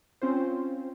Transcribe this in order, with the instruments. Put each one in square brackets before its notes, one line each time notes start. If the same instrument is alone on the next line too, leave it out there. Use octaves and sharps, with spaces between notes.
[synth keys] C4 C#4 F4 C5